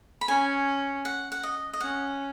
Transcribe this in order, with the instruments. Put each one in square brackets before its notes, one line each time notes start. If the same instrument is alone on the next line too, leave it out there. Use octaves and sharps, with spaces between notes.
[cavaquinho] B5
[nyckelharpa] C#4 [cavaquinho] G#5
[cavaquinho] F#5
F#5
D#5
D#5
[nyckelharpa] C#4 [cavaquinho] F#5